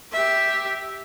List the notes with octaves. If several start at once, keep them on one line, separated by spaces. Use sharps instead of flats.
G4 E5